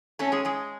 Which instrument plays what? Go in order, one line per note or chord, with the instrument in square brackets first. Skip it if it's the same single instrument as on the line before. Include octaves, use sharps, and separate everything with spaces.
[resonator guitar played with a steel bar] A3 A4 [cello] C#4
[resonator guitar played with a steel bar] G#3 G#4
G#3 G#4